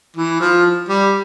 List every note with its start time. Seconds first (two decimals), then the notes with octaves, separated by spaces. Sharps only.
0.17 E3
0.41 F3
0.89 G3